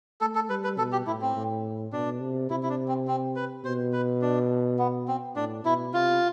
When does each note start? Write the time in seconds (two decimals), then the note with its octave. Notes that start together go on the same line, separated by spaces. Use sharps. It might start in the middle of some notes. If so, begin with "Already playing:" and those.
0.21 A3 A4
0.35 A4
0.50 G3 B4
0.64 B4
0.78 B2 A4
0.92 G4
1.07 A2 E4
1.21 C4
1.36 A2
1.93 B2 D4
2.21 C3
2.50 C3 E4
2.63 E4
2.70 D4
2.88 C4
3.08 C4
3.36 B4
3.65 B2 C5
3.93 B4
4.22 D4
4.79 B3
5.08 C4
5.36 A2 D4
5.64 B2 E4
5.93 C3 F4